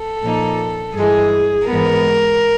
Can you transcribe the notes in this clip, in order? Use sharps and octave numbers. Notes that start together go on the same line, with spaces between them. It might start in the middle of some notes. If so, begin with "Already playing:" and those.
Already playing: A4
A#2 F3 A#3 D#4
G2 E3 G#3 G#4
G#2 E3 G#3 B3 A#4